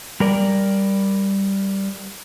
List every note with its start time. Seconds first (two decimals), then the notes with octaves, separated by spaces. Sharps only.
0.20 G3 A#4 D5